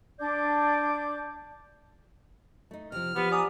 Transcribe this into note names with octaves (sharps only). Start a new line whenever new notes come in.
D4 D5 D6 G6
A3 D#4
C3 F3 F6
F3 B3 G4
D5 F#5 G#5 A#5 D#6